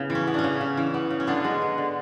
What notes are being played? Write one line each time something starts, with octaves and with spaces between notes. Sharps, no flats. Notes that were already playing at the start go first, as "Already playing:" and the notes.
Already playing: C#3 B3 E4
E3
C#4
B3
C#4 D4
C#3
C#3
E3
B3
C#3
C#4
D3 B3 D4
G#3
B3
D3